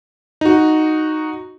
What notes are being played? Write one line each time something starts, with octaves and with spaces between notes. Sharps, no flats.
D#4 F#4